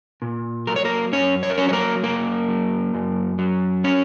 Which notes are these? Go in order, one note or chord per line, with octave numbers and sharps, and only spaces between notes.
A#2
F#3 A#4
C#5
A#3 A#4
F#2 C#4 C#5
C#5
A#4
F#3 C#4 C#5
C#5
A#3 A#4
F#2 A#3 A#4
F#3
F#2
F#3
C#4 C#5